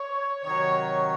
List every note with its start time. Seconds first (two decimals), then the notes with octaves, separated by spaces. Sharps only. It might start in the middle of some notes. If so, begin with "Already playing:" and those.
Already playing: C#5
0.44 C3 D#3 F#3 C#5